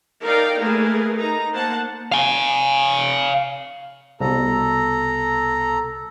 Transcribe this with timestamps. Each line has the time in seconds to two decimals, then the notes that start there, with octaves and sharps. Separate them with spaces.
0.23 D#4 A#4 D5 F5 G5 A#5
0.61 A3 A#3 G#4 A#4 B4
1.16 D#4 A#5
1.52 A#3 C5 F#5 A5
2.12 F5 G#5
4.20 C2 B2 A4 A#5